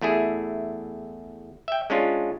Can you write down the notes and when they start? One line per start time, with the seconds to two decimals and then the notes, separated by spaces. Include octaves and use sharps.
0.01 E2 A3 E4 G#4
1.68 E5 G5
1.90 G#3 C#4 D4 F4